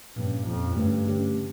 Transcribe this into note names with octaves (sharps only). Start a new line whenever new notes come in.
G2 A#2 F3 C#4
F2 A#2 F3 C#4
G2 D3 A3 C#4 G4
D3 A3 C#4 G4
C#3